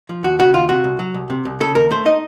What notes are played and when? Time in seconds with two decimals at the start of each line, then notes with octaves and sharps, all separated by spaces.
0.09 F3
0.23 D#2 F#4
0.39 C#3 F#4
0.54 D#2 F4
0.69 C3 F#4
0.84 C2
0.99 F#3
1.14 C2
1.30 C3
1.45 C2
1.60 C#3 A4
1.75 D#2 A#4
1.91 A3 C5
2.06 D#4 D#5